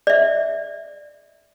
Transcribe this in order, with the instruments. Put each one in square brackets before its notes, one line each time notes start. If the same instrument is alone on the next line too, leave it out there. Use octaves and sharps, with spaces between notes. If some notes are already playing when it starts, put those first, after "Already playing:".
[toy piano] D5 E5